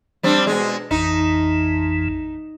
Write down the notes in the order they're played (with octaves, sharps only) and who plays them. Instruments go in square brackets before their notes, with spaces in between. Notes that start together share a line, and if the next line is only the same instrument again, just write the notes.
[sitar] G3 C4 D4
B2 G#3
[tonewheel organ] A1 F2 E3 [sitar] D#4